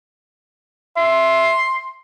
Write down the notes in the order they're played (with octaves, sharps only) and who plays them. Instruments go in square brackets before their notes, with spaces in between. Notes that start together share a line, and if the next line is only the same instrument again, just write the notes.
[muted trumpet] E5 [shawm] C6